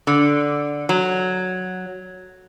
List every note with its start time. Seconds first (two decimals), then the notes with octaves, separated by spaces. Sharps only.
0.07 D3
0.89 F#3